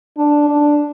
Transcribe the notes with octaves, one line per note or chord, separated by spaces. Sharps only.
D4
D4